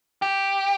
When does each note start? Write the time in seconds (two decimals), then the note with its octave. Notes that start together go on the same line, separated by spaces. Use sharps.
0.22 G4